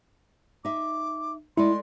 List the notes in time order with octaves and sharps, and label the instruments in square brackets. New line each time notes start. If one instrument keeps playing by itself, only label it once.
[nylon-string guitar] D#4 E5 [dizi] D6
[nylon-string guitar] G#3 A3 D5 [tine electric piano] E4 [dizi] C6